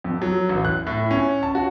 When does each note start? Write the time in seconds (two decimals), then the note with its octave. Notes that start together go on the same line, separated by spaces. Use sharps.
0.04 F2
0.22 F#3
0.49 A1
0.65 F#6
0.87 A2
1.11 C#4
1.43 A5
1.55 F#4